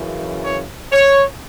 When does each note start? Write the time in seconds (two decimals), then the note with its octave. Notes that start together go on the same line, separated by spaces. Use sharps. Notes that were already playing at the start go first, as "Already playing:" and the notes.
Already playing: F#2 C#3 E3
0.42 C#5
0.91 C#5